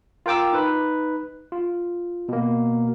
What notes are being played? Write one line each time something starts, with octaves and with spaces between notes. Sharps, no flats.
F4 A#4 G5 D6 E6
D#4 B4
F4
B2 A#3